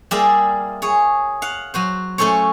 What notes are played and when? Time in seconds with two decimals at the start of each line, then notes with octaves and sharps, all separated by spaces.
0.11 G3 A#3 F4 G#4 D5 E5
0.82 G#4 C#5
1.42 F5 F#5
1.74 F#3 F#4 C5
2.18 A3 C#4 A4 C5 C#5